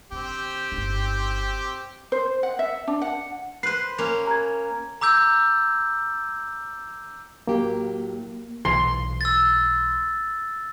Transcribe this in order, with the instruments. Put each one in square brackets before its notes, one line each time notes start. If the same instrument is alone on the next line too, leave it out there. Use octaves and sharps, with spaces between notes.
[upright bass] D3 [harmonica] C4 G4
[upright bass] G1 D#4
[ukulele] C5
F#5
E5
D4
F#5
[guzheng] B4 C5 [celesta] F#6 C7
[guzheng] A#3 C#4
[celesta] A#5 G#6
[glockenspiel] A#5 D6 E6 G6
[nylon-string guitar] A2 F#3 G4 [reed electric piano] A#3
[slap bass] B1 A#2 E3 [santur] C6
[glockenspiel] E6 A6